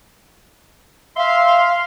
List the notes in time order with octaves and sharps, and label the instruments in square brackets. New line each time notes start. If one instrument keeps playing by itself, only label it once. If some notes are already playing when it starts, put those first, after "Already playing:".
[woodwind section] E5 C6 [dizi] F5